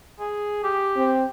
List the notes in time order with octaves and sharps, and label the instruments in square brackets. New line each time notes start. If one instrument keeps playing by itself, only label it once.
[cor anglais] G#4
G4
[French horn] C4